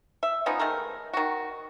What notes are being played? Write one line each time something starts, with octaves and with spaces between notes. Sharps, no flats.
E5
F3 B3 C#4 D#4
D#3 G#3 A3 A#4
D#3 F#4